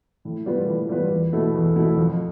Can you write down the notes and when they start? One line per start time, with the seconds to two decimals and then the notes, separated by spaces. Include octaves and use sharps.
0.25 A2
0.46 G3 B3 F4 B4
0.68 A2
0.89 G3 B3 F4 B4
1.11 E2
1.33 B2 A3 E4
1.54 E2
1.76 B2 A3 E4
1.97 F2